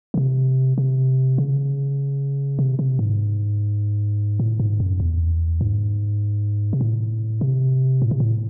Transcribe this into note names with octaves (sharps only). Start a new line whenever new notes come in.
C#3
C3
C3
C#3
C3
C3
G#2
A2
G#2
F#2
E2
G#2
C3
A2
C3
A2
C3
A2